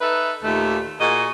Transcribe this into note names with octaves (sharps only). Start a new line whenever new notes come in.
D#4 A4 B4 E5
D#2 A#2 A3 D#4
A#2 F#4 G#4 D#5